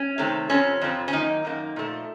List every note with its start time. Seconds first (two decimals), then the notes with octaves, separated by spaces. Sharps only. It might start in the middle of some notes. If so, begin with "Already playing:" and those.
Already playing: C#4
0.18 C3 D#3 A3 C4
0.49 F2 C3 F3 C4 C#4
0.81 F2 C3 F3 C4
1.08 C#4
1.13 F#2 D#3 A#3 D#4
1.45 F#2 D#3 A#3
1.76 A#2 F3 A3